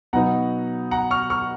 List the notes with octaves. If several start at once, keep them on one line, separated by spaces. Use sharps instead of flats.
B2 F#3 B3 D#4 F#5 A#5
F#5 A#5
C#6 F6
C#6 F6